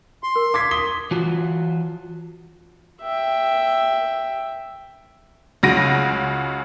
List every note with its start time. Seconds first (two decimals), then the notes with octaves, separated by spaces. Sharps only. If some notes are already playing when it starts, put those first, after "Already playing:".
0.23 C6
0.36 A#4
0.54 F5 D6 G#6 B6
0.71 D#6 B6 G7
1.11 E3 F4 F#4
3.01 E5 G5
5.63 C#2 C#3 F#4 A#6 D7 D#7